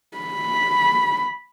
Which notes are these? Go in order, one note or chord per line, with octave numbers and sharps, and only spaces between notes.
B5